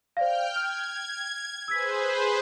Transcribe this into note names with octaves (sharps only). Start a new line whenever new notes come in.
C5 D5 F5 G5 F6 G6
F6 G#6
G#4 B4 C5 E6 G#6 B6